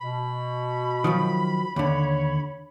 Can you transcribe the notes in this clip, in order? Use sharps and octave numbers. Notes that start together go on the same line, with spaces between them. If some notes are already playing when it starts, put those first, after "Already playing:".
B2 B5
D#3 F3 F#3
D#2 D3 C#5